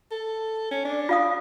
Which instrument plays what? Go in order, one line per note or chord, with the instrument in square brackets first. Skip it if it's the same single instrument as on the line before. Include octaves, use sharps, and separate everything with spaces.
[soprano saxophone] A4
C#4
D4
[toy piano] F4 F5 D#6